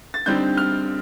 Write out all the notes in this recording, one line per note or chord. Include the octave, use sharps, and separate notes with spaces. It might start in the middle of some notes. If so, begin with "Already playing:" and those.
A6
D3 G3 C4 D#4 G6
F6